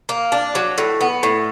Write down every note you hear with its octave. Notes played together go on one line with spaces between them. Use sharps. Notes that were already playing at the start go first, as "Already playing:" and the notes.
A#3
D4
F#3
A2
B3
A2